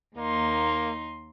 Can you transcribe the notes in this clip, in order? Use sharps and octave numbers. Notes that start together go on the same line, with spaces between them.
D#2 A#3 D#4 C6